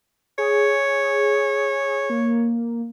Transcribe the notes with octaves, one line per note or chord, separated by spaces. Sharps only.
G#4 C#5
A#3